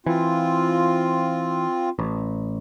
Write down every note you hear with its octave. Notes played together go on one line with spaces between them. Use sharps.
E3 C4 F4
A1